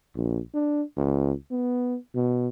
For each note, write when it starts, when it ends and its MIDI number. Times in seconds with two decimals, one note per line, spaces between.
0.16 0.40 34
0.54 0.82 62
0.97 1.33 37
1.51 1.97 59
2.15 2.49 47